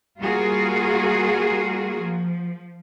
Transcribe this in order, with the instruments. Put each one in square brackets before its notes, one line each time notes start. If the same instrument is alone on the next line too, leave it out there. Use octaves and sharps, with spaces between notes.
[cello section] G3 A#3 F4 F#4 G#4 A#4
F3